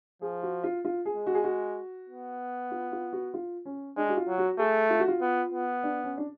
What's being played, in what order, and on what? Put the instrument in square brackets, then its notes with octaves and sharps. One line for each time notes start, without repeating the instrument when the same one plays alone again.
[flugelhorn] F3 [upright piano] G#4
[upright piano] F#4
F4
F4
G#4
[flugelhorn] G#3
[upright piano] F#4
G#4
F#4
[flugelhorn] B3
[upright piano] F4
F4
F#4
F4
C#4
[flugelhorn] G#3 [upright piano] D4
[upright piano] F#4
F4
[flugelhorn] F#3
[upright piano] F#4
[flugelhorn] A3 [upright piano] G#4
[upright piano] F4
F#4
F4
[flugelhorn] B3
B3
[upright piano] D4
C#4
D4